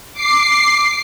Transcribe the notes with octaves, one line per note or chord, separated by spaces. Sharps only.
D6 C7